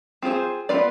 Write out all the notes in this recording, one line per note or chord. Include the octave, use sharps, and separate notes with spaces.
C4 F4 G#4 C5
B3 F4 B4 D5